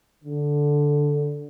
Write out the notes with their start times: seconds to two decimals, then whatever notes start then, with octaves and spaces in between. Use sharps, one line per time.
0.24 D3